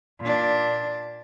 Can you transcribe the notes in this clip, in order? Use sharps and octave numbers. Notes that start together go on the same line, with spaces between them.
A#2 D4